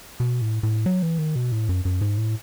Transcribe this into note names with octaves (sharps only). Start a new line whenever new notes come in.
B2
A2
A2
F#3
E3
D#3
B2
A2
F#2
F#2
G#2
A2